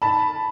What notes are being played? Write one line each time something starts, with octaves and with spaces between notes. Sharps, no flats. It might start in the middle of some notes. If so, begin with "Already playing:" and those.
A5 B5